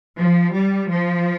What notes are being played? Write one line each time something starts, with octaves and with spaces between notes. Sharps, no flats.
F3
G3
F3